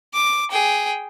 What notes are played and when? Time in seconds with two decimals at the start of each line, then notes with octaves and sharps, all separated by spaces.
0.14 D6
0.51 G#4 G5